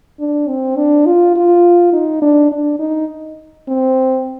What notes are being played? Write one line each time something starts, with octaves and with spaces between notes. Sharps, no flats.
D4
C4
D4
F4
F4
D#4
D4
D4
D#4
C4